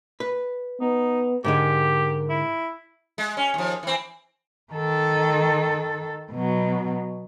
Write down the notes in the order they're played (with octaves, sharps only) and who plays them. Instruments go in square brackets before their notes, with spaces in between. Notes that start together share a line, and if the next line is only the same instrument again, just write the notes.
[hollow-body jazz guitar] B4
[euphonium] B3 [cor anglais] D#4
[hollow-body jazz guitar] G#2 D3 G#3 [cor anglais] G4 [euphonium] A#4
[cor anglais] E4
[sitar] G#3
C#4
D#2 F3
E3 C4
[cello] D#3 A4
B2 F#3